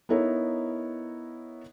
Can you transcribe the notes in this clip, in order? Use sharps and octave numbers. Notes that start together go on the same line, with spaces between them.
B3 D#4 E4 A#4 C#5